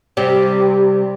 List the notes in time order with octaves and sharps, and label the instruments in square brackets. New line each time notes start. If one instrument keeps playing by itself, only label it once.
[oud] C3 G3